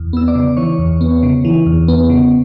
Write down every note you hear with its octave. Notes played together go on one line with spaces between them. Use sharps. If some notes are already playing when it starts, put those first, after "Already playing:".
Already playing: E2
B3 E6
D5 D6
C#3
E3 C#5 C#6
E2
B3
C#3
E3
E2
B3
C#3